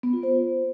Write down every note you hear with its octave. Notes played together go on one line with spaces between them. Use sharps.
B3
F4
C5